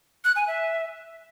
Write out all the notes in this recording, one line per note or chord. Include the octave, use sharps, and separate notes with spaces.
F#6
G#5
E5